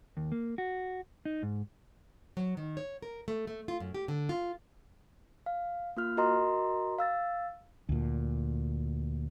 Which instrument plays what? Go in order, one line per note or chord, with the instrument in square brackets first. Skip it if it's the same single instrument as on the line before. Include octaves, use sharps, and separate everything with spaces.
[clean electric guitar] D#2
A#3
F#4
D#4
G#2
[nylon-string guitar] F#3
D#3
C#5
A#4
A3
A3
F4
F#2
G4
D3
F4
[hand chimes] F5
A#3 F4 F6
F#4 A#4 D#5 A#5 C6
F5 E6 A6
[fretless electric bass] D2 A#2